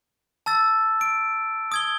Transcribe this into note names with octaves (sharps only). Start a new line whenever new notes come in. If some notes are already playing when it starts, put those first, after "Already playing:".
A5 E6 A6
D7
D#6 G#6 G7